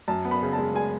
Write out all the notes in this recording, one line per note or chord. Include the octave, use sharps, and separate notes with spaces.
F#2 A5
B3
B5
C#3
A5
G#3
G#3 G#5